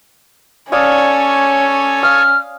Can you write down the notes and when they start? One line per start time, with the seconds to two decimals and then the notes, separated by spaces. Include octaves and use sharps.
0.72 C#4 A4 C#5 D5 F5 G#5 D#6
2.03 F5 D#6 F6